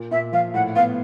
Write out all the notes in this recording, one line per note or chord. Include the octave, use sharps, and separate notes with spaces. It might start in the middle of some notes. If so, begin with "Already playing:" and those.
Already playing: A#2
A#2 E5
F3 F5
A2 F#5
B3 F5